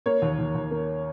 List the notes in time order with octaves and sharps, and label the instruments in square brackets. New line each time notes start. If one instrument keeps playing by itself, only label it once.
[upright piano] A#3 C#5
D#2
D#2
D#2
A#3